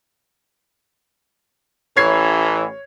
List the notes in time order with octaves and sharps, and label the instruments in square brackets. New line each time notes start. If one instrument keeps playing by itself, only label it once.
[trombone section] A1 E3 [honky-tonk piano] C#5 G#6 C7